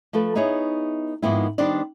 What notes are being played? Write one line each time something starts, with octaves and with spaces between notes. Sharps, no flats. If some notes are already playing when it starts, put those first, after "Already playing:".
F3 A3 A4 B4
B3 D#4 E4 G#4 C#5
G#2 D#3 F3 B3 C4 E4
D#3 G3 B3 D4 C5 D5